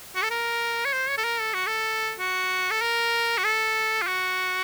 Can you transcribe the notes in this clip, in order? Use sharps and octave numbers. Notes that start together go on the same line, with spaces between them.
F#4
A4
A#4
C#5
C5
C#5
A4
A#4
A4
F#4
A4
F#4
A4
A#4
F#4
A4
F4
F#4